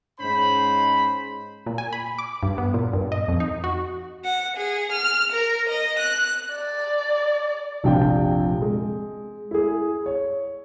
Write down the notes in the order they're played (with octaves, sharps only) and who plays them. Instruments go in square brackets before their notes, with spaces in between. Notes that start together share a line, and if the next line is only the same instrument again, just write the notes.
[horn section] G#2 C#4 C5 B5
[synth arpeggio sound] A#2
G#5
B5
D6
G2
B3
A#2
G2
D#5
F2
D#4
F#4
[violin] F#5
G#4
F6
A#4
D#5
F#6
[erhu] D5
[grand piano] F1 A#1 C3 D4 F4 G5
G#3
E4 G#4
C#5